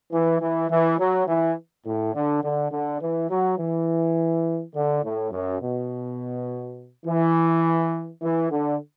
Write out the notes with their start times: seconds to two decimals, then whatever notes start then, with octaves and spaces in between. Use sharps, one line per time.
0.12 E3
0.40 E3
0.69 E3
0.99 F#3
1.27 E3
1.86 A2
2.14 D3
2.43 D3
2.71 D3
3.01 E3
3.30 F#3
3.59 E3
4.75 D3
5.03 A2
5.32 F#2
5.61 B2
7.06 E3
8.22 E3
8.51 D3